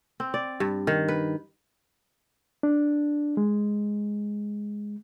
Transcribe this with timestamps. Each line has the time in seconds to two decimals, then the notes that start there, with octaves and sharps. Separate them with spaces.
0.20 C4
0.34 D5
0.60 G2
0.87 D#3
1.08 B4
2.63 D4
3.37 G#3